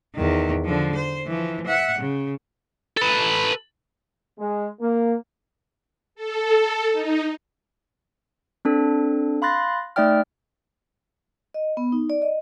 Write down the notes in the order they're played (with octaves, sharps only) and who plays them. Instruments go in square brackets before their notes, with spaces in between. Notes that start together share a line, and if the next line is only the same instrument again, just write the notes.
[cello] E2 D#3
D3 F3
C5
E3 F3
E5 F#5
C#3
[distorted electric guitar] A4 B4
[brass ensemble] G#3
A#3
[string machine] A4
D#4
[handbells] C4 D4 A4
F5 B5 C6 F#6 A6 A#6
A3 D#4 D5 E5 G5 F6
[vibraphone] D#5
B3
D#4
D5
D#5